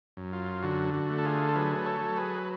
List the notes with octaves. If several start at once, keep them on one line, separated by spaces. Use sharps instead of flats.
F#2
F4
D3 F#4
F#4
A3
A4
F4 G#4
A4
F#3 G#4 B4
B4
A4 C#5
F#3
G#4 B4